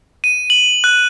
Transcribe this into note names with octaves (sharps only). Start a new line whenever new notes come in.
D#7
F#7
F#6